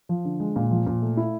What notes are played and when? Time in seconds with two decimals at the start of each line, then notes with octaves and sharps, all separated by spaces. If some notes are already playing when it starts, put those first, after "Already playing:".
0.09 F3
0.25 D3
0.40 G#3
0.56 A#2
0.71 F3
0.86 A#2
1.02 A3
1.17 E4